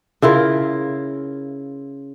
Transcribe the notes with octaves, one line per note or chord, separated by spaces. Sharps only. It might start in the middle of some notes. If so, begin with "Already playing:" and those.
C#3 E4 F4 A#4